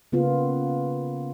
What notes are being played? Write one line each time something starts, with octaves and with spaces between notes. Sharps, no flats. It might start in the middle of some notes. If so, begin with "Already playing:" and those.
C#3 A#3 B3 F4